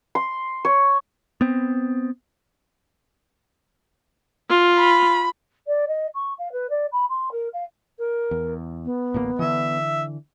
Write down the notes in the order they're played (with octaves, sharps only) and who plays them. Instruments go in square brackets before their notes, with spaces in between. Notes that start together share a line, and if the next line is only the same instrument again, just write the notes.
[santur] C6
C#5
[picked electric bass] B3 C4
[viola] F4
[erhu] B5
[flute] D5
D#5
C#6
F5
B4
D5
B5
C6
A#4
F5
[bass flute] A#4
[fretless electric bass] E2
[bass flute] B3
[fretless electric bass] D1 A1 A#3
[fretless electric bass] D3 E3 [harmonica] E5